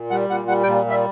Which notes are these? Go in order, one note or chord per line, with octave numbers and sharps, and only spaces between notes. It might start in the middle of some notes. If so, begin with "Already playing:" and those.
Already playing: A#2
G3 F#5
A#2 F#5
G3 F#5
G5
A#2
G3 E5